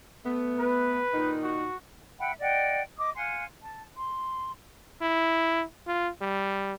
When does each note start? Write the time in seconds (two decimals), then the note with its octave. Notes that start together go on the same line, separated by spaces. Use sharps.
0.25 A3 B3
0.59 B4
1.14 A#2 D#3 D#4
1.43 F#4
2.19 E5 F#5 G5 B5
2.39 D5 D#5 F#5 G5
2.98 D#5 D6 D#6
3.15 F5 F#5 G#5 C6
3.63 A5
3.97 C6
5.02 E4
5.87 F4
6.21 G3